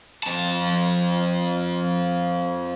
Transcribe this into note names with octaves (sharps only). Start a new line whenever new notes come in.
F2 A5